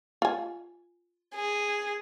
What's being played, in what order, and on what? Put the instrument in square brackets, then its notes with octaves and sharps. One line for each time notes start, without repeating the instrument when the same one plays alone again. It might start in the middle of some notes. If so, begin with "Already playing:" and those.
[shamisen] F4 G#5
[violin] G#4